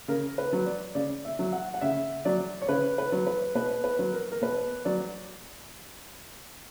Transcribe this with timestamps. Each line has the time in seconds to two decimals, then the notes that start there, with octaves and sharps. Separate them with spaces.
0.08 C#3 A#4
0.38 B4
0.53 F#3
0.66 D5
0.95 C#3 D5
1.25 E5
1.39 F#3
1.53 F#5
1.74 F#5
1.81 C#3 E5
2.25 F#3 D5
2.62 C#5
2.68 C#3 B4
2.98 B4
3.12 F#3
3.27 B4
3.55 B2 B4
3.84 B4
3.99 F#3
4.13 A#4
4.32 A#4
4.41 B2 B4
4.85 F#3 D5